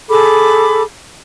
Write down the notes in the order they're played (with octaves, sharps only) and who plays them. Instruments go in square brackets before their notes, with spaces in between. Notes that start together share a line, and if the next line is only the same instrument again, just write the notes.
[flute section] G#4 A4 B5 D6